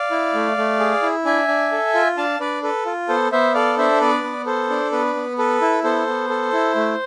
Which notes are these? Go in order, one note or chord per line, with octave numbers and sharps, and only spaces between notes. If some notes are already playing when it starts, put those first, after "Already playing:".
Already playing: D5 F5
E4
A3
A3
G#4
E4
D4 E5 G#5
D4
A4
F4
D4 F5 A5
D4 B4 D5
A4 B4
F4
B3 A4 C5
B3 C5 E5
A4 D5 F5
D4 C5 E5
B3 B4 D5
B3
A4 C5
D4
B3 B4
B3
A4 B4
E4
B3 A4 C5
B3
A4
E4
A3